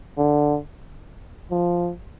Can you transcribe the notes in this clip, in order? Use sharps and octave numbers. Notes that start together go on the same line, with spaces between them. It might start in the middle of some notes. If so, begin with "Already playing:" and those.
D3
F3